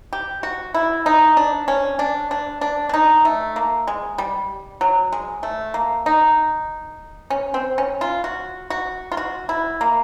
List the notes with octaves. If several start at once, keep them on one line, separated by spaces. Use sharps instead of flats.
G4
F#4
E4
D#4
D4
C#4
D4
D4
D4
D4
D#4
A3
A#3
G#3
G3
F#3
G#3
A3
A#3
D#4
C#4
C4
C#4
F4
F#4
F#4
F4
F#4
E4
A#3